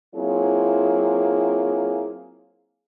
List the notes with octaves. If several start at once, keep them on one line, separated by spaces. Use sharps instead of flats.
F#3 A#3 C4 E4 F4 G#4